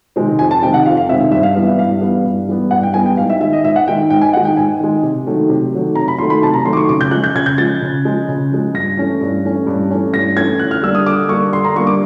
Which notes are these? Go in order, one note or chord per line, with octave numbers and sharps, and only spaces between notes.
C3 D#3 G#3 C4
F2 G#5
A5
C3 D#3 G#3 C4 G5
F#5
F2 F5
F5
C3 D#3 G#3 C4 E5
E5
G2 E5
F5
E3 G3 B3 F5
E5
G2 F5
E3 G3 B3
G2
E3 G3 B3
G2 F#5
G5
E3 G3 B3 G#5
G5
G#2 F5
E5
D#3 G#3 E5
D#5
G#2 E5
F#5
D#3 G#3 G5
G#2 G5
G#5
D#3 G#3 F#5
G5
G#2 G#5
D#3 G#3
C3
D#3 F#3 A3
C3
D#3 F#3 A3
C3 A#5
B5
D#3 F#3 A3 C6
B5
C3 A5
A#5
D#3 F#3 A3 C6
D6
C#6
C#3 D6
G6
F3 G#3 F#6
G6
C#3 G#6
G6
F3 G#3 A6
C#3
F3 G#3
C#3
F3 G#3
G2 A#6
E3 A3 C#4
G2
E3 A3 C#4
G2
E3 A3 C#4
G2 A#6
E3 A3 C#4 G#6
D3 F#6
F6
G3 A#3 D4 E6
D#6
D3 D6
G3 A#3 D4 C#6
D3 C6
A#5
G3 A#3 D4 C#6
D6